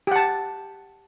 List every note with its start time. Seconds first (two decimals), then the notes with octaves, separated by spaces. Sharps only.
0.07 G4
0.11 F#5
0.16 A5